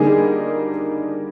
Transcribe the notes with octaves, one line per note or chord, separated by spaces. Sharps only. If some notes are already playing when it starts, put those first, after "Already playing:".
Already playing: D3 G3 A#3 D#4 G#4